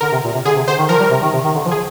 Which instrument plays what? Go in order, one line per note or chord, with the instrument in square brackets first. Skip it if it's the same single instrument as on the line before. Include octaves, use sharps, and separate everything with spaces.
[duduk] D3 [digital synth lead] A#4
[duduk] C3
A#2
C3
[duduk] D3 [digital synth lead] G#4
[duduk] C3
[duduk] D3 [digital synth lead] C5
[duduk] D#3
[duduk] F3 [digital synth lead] A#4
[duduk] G3
C3
D#3
C3
D#3
D3
F3
[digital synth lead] G#4